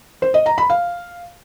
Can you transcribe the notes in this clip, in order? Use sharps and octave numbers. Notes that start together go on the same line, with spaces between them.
C5
D#5
A#5
B5
F5